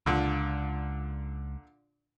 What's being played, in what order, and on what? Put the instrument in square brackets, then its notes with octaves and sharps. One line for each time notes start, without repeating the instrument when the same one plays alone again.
[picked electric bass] C#2 [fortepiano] A#2 D3